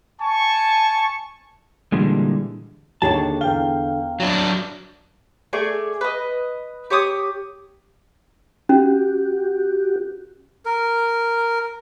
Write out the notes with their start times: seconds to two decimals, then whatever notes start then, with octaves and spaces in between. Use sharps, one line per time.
0.21 G#5 A5 C#6
1.92 A#2 D3 E3 G3 G#3
3.02 D#2 D3 D#3 G#4 C#5 A5
3.41 E2 F5 G5 G7
4.20 F#3 D4
5.53 A3 G#4 D5 G#5
6.01 B4 D#5
6.90 G4 C#5 D6 D#6
8.69 C#4 F#4 G4
10.66 A#4